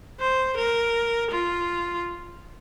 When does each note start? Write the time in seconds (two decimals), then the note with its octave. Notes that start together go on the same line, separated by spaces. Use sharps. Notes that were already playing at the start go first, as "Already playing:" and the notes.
0.20 C5
0.57 A#4
1.31 F4